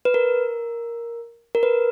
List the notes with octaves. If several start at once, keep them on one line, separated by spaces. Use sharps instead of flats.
B4
A#4
A#4
B4